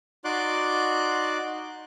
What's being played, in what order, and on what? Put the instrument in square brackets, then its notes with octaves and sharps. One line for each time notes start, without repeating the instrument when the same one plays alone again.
[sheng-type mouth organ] D#4 F#4 D5 C6 D6 F#6